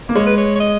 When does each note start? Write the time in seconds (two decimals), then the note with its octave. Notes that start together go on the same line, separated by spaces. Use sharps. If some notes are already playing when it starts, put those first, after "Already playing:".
0.09 A#3
0.15 G#3 C#5
0.26 B4
0.38 C#5
0.55 C#5
0.60 D#5